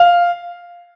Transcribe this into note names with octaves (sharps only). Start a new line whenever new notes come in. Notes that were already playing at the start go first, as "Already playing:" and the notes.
Already playing: F5